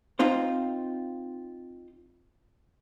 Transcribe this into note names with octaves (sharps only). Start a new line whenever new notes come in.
C4 D#4 F4 C5